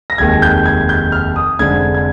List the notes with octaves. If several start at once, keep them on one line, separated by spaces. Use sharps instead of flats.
A#6
F1 D#2 D#3 G#3 G#6
G6
G#6
G6
F6
D#6
F1 F2 D3 G#3 C4 G#6
G#6